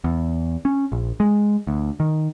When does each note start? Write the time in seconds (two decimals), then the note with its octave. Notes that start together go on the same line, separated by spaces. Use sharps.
0.04 E2
0.65 C#4
0.92 A#1
1.20 G#3
1.67 D2
2.00 D#3